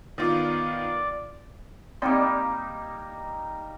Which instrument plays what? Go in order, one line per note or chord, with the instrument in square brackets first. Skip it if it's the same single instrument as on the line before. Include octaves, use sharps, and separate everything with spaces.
[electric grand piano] D#3 B3 F4 [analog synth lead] D5
[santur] G3 A#3 D#4 [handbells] C4 D5 C6